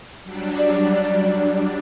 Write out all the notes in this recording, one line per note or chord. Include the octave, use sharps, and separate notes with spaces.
F#3 G3 D4
D5